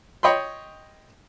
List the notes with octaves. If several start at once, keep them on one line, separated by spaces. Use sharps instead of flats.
C#5 D#5 G5 B5 C6